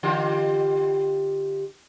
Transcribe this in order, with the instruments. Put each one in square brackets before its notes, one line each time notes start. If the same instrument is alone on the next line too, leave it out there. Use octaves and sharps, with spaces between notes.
[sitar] D3 F4 G4